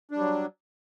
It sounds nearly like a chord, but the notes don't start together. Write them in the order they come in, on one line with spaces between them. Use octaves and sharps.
D4 G3 F#3